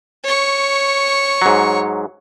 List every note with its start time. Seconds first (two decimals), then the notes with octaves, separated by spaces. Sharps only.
0.24 C#5 C#6
1.42 G#2 F#3